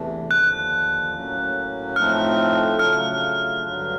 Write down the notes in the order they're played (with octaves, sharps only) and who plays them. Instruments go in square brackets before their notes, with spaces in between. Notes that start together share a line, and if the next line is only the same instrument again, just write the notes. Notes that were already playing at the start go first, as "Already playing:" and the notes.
Already playing: [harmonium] E2 C3 E3 A3 D4
[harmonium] D#2 D3 F3 [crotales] F#6
[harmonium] A2 F#3 A#3 C#4
[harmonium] A2 F3 A3 C4 D#4 [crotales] F6
[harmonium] C#3 F#3 A3 D4 F4 [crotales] F6
[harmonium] G2 D3 F#3